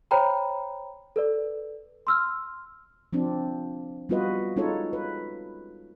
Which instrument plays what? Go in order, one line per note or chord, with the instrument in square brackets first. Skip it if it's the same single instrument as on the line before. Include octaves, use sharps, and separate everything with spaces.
[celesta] C5 C#5 G5 A#5 B5
A4 B4 D5
C6 E6 F6
[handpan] F3 C4 D4
G3 B3 F4 F#4 B4 D#5
G#3 C#4 D#4 F4 A4 C#5
B4